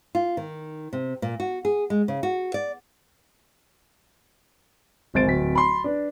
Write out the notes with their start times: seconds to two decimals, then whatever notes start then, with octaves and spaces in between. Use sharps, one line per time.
0.15 F4
0.37 D#3
0.93 C3
1.22 A#2
1.40 F#4
1.65 G#4
1.90 G#3
2.08 C#3
2.23 F#4
2.54 D5
5.14 D1 G#1 G#3 C5 A6 D7
5.27 D1 B6
5.55 B5 C6
5.84 D4 B4